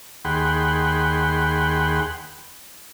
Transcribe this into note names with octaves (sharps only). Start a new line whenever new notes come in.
D#2 G#4 F#5 G5 B5 C6